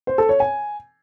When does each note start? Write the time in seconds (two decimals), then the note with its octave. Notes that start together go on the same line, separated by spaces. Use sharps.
0.07 C5
0.18 A4
0.29 C#5
0.40 G#5